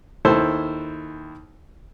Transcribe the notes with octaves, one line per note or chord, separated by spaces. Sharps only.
D#2 E4 A4 C5